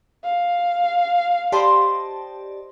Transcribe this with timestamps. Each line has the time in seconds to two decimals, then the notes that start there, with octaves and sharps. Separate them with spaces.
0.24 F5
1.52 G4 C5 D5 D#5 A5 B5